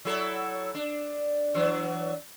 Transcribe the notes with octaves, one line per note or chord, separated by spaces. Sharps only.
F#3 E4 A4
D4
E3 F#3 D4